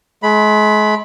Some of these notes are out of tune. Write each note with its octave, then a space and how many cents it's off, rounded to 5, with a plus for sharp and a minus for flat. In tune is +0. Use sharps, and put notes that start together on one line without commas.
G#3 +40 B5 +0